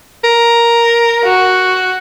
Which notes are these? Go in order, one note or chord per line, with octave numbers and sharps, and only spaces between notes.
A#4
F#4